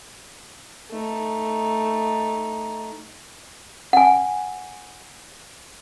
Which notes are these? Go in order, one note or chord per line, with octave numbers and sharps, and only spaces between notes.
A3 D#4
F#5 G#5